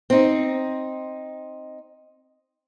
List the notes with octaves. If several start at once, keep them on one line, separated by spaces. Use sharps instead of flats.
C4 D#4